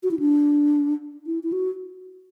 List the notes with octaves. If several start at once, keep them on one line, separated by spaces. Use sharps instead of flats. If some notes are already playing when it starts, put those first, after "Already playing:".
F#4
E4
D4
E4
E4
F#4